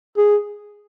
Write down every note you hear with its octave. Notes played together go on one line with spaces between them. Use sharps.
G#4